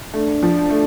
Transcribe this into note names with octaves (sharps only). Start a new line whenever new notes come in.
A3 D4
F3
A3